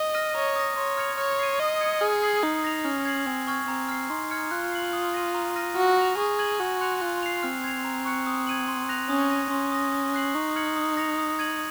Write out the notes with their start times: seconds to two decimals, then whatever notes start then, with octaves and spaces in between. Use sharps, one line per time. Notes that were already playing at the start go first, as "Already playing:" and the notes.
Already playing: D#5
0.14 F6 A#6 D#7
0.35 C#5 A#5
0.56 D#6 A#6
0.76 C#5 C6
0.97 F6 G#6 C#7 F7
1.18 C#5 F6
1.39 C7 D#7
1.60 D#5 D#6
1.81 G#6 C#7
2.01 G#4 F6
2.22 G#6 C7 F#7
2.43 D#4 D#6
2.64 A#6 F7
2.85 C#4 F6
3.05 G#6 C7 F#7
3.26 C4 G#5
3.47 C#6 F6 G#6
3.68 C4 A#5
3.89 F6 C7
4.10 D#4 C6
4.31 F6 G#6 C#7
4.51 F4 F#6
4.72 C7 F#7
4.93 D#6
5.14 A#6 D#7
5.35 A#5
5.56 F6 A#6 D#7
5.76 F#4 F6
5.98 A#6 F7
6.18 G#4 C#6
6.39 G#6 D#7 F#7
6.60 F#4 G#5
6.81 C6 F#6 C#7 F7
7.01 F4 F#6
7.23 C7 F7
7.43 C4 F6
7.64 G#6 C7 F7
7.84 A#5
8.05 C#6 F#6 C#7
8.26 D#6
8.47 G#6 D#7 F#7
8.68 C6
8.89 F#6 A#6 F7
9.09 C#4 D#6
9.30 A#6 D#7
9.51 C#4 C6
9.72 D#6 A#6
9.93 D#6
10.14 F#6 C7 F#7
10.34 D#4 C#6
10.55 F6 G#6 C#7 F#7
10.76 D#6
10.97 A#6 C#7 F7
11.18 D#6
11.39 G#6 D#7 F#7